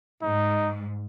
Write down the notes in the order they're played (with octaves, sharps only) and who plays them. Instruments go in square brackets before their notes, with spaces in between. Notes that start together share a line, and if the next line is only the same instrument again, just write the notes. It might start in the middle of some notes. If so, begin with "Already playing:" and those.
[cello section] G#2 [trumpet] D#4